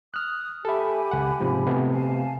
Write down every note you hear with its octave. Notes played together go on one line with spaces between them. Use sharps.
D#6 F6 F#6
G4 A4 E5 G#5 B5
C#2 F#5
G#2 C3 F3
C3 A3 B3
F5 G#5 A5